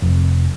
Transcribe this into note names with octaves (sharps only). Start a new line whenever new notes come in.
F1